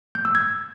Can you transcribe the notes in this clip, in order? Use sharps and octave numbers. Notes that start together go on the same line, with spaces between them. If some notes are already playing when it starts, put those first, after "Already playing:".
G6
E6
G#6